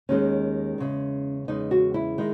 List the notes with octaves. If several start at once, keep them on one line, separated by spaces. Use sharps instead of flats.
D#2 D#3 G#3 C#4
E2 C#3 G#3
E2 C#3 G#3 D#4
F#4
E4
D#3 G#3